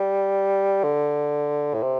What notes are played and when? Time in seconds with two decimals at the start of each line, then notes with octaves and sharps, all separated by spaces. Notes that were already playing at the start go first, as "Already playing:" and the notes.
Already playing: G3
0.83 D3
1.74 A2
1.82 C3